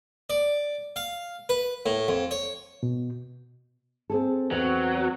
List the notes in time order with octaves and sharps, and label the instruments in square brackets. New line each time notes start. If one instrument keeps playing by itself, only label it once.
[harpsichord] D5
F5
B4
A2
F2
C#5
[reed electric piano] B2
[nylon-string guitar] C4 G#4 A4
[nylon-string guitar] E2 C4 F#4 [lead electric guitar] F#3